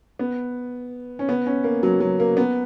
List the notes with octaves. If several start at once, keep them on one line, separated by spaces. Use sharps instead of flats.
B3
C#4
B3
C#4
A#3
F#3
F#3
A#3
B3